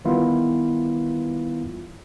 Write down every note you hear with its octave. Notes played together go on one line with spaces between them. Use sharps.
D#3 E3 G3 B3 E4 F4